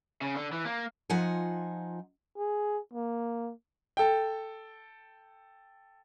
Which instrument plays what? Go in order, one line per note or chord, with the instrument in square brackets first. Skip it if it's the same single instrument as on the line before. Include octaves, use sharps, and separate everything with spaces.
[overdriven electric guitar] C#3
D3
E3
A#3
[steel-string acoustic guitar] F3 D#4 F4 F#5 G#5
[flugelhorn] G#4
A#3
[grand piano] A4 G5